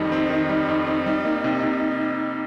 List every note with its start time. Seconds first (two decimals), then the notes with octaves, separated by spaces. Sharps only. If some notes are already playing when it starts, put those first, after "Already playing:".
Already playing: F2 D#3 G3 D#4
0.12 C4
0.30 D#3
0.49 G3
0.68 F2
0.87 C4
1.06 G3
1.25 A#3
1.44 C3
1.63 C3